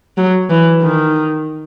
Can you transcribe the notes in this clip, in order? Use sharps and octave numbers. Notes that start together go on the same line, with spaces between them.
F#3
E3
D#3